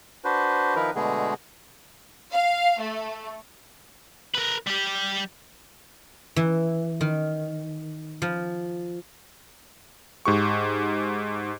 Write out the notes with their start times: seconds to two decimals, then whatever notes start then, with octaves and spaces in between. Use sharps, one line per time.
0.25 D4 F#4 B4 C5
0.75 D#3 F3 D#4 E4 A#4 B4
0.95 B2 D3 G#3 A3 B3 G#4
2.31 F5
2.81 A3
4.35 A#4 B4
4.67 G3 G4
6.36 E3
7.01 D#3
8.22 F3
10.26 G#2 G4 C#6